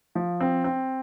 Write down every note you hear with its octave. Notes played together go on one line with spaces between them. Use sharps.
F3
C4
C4